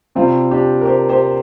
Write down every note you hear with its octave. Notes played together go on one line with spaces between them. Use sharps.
C3 G3 C4 F4
D4 G4
A#4
G4 C5
G4 C5